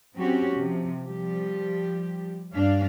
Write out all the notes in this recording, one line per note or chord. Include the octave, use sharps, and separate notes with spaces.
F#3 C4 C#4 F#4 G4
C3 F3
F3 G3 G4
G2 D4 F5